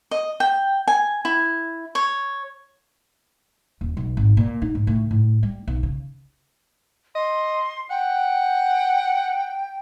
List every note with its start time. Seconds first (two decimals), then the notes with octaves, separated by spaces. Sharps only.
0.11 D#5
0.40 G5
0.88 G#5
1.25 E4
1.95 C#5
3.81 D#1
3.97 B1
4.17 G#1
4.37 A#2
4.62 D#4
4.75 G#2
4.87 A2
5.11 A2
5.43 G3
5.67 B1
5.83 C#3
7.15 D#5 C6
7.90 F#5 G5